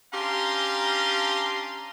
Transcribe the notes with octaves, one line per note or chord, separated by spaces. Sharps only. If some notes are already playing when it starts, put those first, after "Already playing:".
C#4 D4 G4 F5 A#5 C6